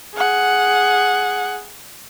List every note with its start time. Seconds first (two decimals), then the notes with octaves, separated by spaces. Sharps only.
0.15 G#4 F#5